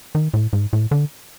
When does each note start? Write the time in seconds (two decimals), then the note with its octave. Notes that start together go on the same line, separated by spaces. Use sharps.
0.15 D#3
0.34 A2
0.53 G#2
0.73 A2
0.91 D3